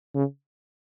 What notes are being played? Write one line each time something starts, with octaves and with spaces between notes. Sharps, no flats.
C#3